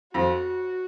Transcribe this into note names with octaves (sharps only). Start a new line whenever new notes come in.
F2 F#4